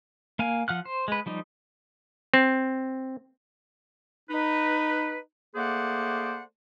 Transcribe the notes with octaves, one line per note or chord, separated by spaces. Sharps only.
A#3 F5 G#5
F3 F#5 F6 F#6
C5
G#3 B4
F3 G3 D#4
C4
D#4 B4
A3 A#3 G#4 C5 D5 F#5